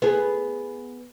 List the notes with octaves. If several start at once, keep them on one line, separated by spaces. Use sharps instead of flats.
B3 G#4